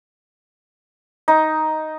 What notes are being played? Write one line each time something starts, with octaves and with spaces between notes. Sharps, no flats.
D#4